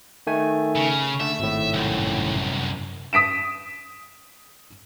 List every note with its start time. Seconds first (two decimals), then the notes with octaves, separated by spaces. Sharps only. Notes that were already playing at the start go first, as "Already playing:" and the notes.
0.27 D#3 A3 G#5
0.76 C#3
1.20 D3 A3 E5
1.39 G#1 A2
1.74 C2 F#2
3.13 D#6 B6 D7 E7